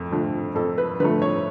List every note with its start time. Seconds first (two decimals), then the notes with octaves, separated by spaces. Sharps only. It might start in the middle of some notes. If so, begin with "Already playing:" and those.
Already playing: F2 A3
0.12 D3 F3 A3
0.55 F2 A4
0.78 B4
1.00 D3 F3 A3 B4
1.22 C#5